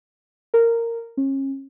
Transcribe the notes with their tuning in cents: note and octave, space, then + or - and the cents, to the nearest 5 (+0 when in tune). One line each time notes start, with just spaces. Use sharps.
A#4 -10
C#4 -35